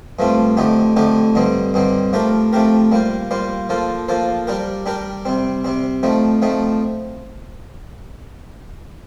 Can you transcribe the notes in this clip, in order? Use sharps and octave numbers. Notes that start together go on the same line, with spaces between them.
G2 F3 A3 C4 F4
F2 D3 A3 D#4 G4
F2 D3 A3 D#4 G4
G2 D3 G3 C4 D#4
G2 D3 G3 C4 D#4
F3 A3 C4 G4 A#4
F3 A3 C4 G4 A#4
G3 A#3 F4 C5
G3 A#3 F4 C5
F3 A#3 F4 A4 C5
F3 A#3 F4 A4 C5
G3 D4 G4 A#4
G3 D4 G4 A#4
C3 G3 C4
C3 G3 C4
F3 A3 C4 D#4
F3 A3 C4 D#4